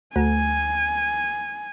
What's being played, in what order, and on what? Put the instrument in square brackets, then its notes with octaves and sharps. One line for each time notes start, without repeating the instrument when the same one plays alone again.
[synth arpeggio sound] D2 [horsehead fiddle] G#5